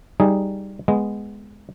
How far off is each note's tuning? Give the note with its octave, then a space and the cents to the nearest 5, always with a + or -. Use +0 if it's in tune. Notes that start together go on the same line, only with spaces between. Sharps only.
G3 +0 D#4 +0 G#4 +0
G#3 +0 B3 +5